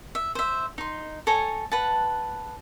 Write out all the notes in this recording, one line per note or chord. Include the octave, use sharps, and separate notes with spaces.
E5
C5 E5
D#4 C6
A4 C#5 G#5 A#5
B4 F#5 A5